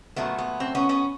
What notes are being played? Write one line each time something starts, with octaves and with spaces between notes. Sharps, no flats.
A#2 F#3 A3 B3
B3
C4
B3 C#4
B3 C#4